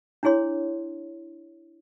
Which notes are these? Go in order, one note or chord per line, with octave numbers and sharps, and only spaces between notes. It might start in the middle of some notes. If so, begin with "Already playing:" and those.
D4 E4 G#4 C#5 C6